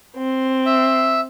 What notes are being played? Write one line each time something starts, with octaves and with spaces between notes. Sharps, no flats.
C4
E5